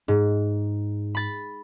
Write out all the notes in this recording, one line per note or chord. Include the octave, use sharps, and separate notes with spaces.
G#2
B5 A6